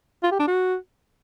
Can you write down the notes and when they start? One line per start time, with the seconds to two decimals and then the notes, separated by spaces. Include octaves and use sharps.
0.23 F4
0.31 G4
0.39 D4
0.47 F#4